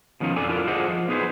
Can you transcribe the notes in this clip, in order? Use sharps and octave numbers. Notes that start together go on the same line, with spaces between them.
B2 D#3 F3 C#4 D#4 F4
F2 D3 A4 D5 G#5
D4 E4 F4 A#4
F4 G#4 C5 D5 D#5 F#5
F3
B3 D#4 G#4 B4 C5